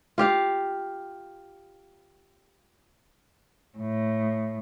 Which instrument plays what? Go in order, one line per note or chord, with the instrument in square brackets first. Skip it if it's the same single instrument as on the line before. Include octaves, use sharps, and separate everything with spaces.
[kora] F4 G4 F5
[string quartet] A2